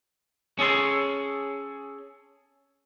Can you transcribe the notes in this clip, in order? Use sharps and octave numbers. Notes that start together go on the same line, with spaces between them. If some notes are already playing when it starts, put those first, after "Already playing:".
C#4 G#4 A4 C6